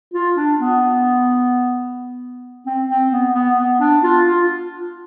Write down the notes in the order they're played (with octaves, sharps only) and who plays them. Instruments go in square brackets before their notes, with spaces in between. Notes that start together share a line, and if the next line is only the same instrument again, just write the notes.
[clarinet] F4
D4
B3
C4
C4
B3
B3
B3
D4
F4
F4